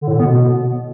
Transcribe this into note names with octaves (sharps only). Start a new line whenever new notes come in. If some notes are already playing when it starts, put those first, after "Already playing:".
D3
A2
D3
B3
B2